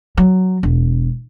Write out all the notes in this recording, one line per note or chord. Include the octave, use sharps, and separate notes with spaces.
F#3
E1